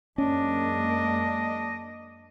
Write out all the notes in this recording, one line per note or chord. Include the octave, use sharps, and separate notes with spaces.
F#2 G#3 A#3 C#4 D4 D#5